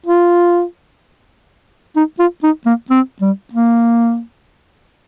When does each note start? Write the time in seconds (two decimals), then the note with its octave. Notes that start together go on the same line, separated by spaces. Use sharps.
0.06 F4
1.96 D#4
2.19 F4
2.43 D#4
2.66 A#3
2.90 C4
3.21 G3
3.54 A#3